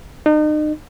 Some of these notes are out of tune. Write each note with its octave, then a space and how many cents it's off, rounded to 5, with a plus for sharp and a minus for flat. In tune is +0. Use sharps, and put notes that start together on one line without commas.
D#4 -40